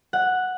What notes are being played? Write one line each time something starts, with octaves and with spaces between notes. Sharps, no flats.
F#5